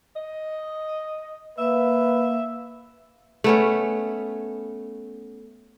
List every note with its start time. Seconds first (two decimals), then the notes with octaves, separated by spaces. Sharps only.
0.16 D#5
1.58 A#3 B4 E5
3.44 A3 B3 C#4